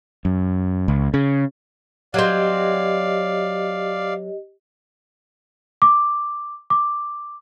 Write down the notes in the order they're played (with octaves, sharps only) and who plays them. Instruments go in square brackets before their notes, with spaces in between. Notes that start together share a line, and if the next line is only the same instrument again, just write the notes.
[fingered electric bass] F#2
C#2
C#3
[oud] F#3 C4 [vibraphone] G4 D#5 [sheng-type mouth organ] D5 F5
[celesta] D6
D6